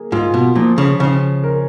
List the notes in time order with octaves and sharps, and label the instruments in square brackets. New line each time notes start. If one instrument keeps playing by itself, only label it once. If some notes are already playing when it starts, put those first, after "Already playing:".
Already playing: [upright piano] A#3 G#4
[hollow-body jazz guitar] G#2 [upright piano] F4
[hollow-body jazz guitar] B2
[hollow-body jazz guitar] A#2 [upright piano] F3
[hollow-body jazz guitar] C#3
[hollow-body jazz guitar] C#3 [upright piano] C#4
[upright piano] A#4